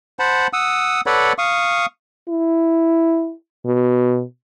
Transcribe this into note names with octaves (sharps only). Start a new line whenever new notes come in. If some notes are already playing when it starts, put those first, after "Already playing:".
C5 F#5 A5 B5
F#5 D#6 E6
A4 B4 C#5 D5 F#5 B5
F5 C#6 D#6
E4
B2